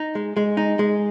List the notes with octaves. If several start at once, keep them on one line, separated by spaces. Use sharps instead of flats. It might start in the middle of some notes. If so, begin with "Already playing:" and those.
Already playing: D#4
G#3
G#3
D#4
G#3